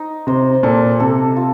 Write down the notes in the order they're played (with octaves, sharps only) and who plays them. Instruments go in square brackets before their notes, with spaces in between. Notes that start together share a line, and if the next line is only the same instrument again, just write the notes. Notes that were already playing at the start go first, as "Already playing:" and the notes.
Already playing: [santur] D#4
[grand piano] C3 [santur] C5
[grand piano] A#2 [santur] A4
[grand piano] C3 [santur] A4
[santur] F4